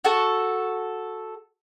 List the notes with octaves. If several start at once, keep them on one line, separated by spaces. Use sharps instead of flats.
F#4 A4 A5